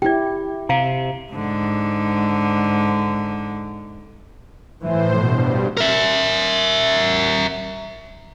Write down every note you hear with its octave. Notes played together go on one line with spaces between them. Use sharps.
E4 G4 D5 G5
C3 F5 A#5
G#2 D3
A2 E3 C5
G2 B2
A#4 E5